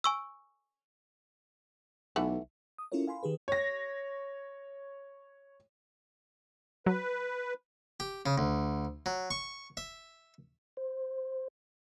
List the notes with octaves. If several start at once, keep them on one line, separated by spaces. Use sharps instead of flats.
G#5 C#6 E6
B1 E3 A3 F#5
D#6
C#4 E4 F4 A4 A#4 C#5
F5 G#5 B5 C6
D#3 G4 G#4 B4
C#5 A#6
F#3 B4
G4
C#3
D2
F#3
C#6
E5
C5